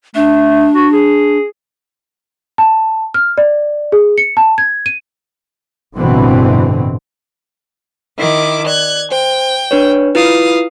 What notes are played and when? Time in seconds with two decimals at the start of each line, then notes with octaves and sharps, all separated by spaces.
0.15 A3 D4
0.75 F#4
0.93 G#4
2.58 A5
3.14 F6
3.38 D5
3.92 G#4
4.18 C#7
4.37 A5
4.58 G#6
4.86 D#7
5.96 A1 G2 B2 D3 E3 C4
8.18 D#3 E4 D6
8.67 D5 F#6 G#6
9.12 C5 G5
9.71 D4 B4 C#5
10.15 E4 F4 B4 F5 D#6